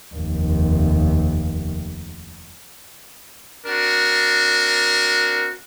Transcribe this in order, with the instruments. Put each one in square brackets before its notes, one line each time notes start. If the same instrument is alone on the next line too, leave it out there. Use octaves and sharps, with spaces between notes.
[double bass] F1 D#2
[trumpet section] C4 D4 F#4 A#4